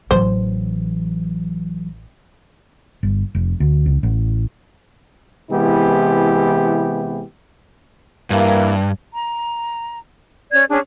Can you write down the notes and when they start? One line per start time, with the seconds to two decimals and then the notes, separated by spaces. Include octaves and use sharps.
0.11 A1 E3 F#3 C5
3.03 G1
3.35 F1
3.60 D2
3.86 C#2
4.03 A1
5.51 C3 E3 G#3 B3 E4 G4
8.31 G2 E3 A#3
9.15 A#5
10.51 C#4 D5 G#6
10.69 C#4 D4 G#4